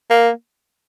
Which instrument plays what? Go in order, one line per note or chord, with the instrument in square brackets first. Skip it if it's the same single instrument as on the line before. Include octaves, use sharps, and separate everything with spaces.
[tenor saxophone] A#3